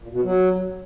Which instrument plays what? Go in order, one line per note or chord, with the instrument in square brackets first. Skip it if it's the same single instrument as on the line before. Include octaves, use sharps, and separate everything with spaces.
[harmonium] A#2
B2
F#3